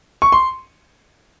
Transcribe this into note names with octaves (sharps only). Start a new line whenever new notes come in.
C#6
C6